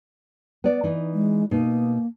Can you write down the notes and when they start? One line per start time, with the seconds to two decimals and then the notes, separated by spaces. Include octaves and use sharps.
0.64 B3 D5
0.84 E3 D#4
1.14 G#3
1.51 B2 A#3 D#4